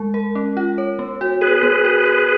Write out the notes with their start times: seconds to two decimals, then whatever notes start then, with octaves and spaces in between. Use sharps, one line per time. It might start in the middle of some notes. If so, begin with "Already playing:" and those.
Already playing: G#3
0.14 A#4
0.35 C#4
0.57 F4
0.78 C#5
0.99 B3
1.21 F#4
1.41 G#4 A#4 B4
1.63 B3
1.85 F#4
2.06 A#4